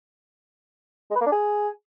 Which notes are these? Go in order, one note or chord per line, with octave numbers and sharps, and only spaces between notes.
G#3
B4
A#3
D4
G#4